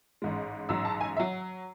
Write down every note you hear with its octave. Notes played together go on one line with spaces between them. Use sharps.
A1 G#2 G#3
A1 G#2 F#3 E6
A5
G#5
E5
F#3